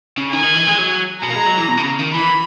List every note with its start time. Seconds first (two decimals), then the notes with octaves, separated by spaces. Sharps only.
0.18 C#3
0.33 D#3 G#5
0.44 D#3
0.55 E3
0.67 G#3
0.78 F#3
1.23 B2 A#5
1.30 A#3
1.35 G#3
1.46 F#3
1.57 E3
1.68 B2
1.77 D#3
1.83 C#3
1.99 D#3
2.14 E3 B5